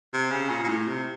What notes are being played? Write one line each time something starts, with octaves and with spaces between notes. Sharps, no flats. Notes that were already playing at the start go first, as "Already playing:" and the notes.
C3
C#3
A#2
A#2
A2
C3